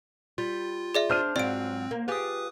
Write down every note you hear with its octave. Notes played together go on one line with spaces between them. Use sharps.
G3 F4
G#4 D5 E5
D4 C5 F6 D#7
G#2 F#3 C4 F4 D5 D7
A#3
F4 G4 G#4 B4 D#6